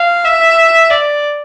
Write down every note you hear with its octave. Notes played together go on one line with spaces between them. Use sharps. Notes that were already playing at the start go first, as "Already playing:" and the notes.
Already playing: F5
E5
D5